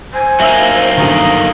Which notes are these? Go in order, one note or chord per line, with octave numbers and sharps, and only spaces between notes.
C5 G#5
F#3 A#3 D#4 E5 E6
G1 D#3 A#5 D#6